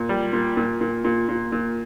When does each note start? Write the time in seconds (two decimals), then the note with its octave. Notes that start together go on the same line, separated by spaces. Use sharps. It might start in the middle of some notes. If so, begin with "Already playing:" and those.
Already playing: A#2
0.09 G3
0.33 A#2
0.57 A#2
0.81 A#2
1.04 A#2
1.29 A#2
1.52 A#2